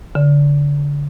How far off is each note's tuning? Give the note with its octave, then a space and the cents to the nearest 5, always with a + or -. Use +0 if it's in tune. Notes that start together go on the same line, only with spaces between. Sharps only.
D3 -30